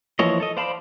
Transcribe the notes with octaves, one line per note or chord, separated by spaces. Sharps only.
E3 F3 A#3 C#5 D#5
A4 D#5
C5 D5 F5 A5 B5